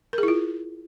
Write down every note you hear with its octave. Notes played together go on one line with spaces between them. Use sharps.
A#4
G#4
E4
F4